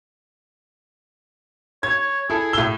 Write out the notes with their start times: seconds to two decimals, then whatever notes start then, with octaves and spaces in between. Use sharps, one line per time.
1.83 C#5 G#6
2.30 E4 G#4 A4
2.53 A2 E6 G7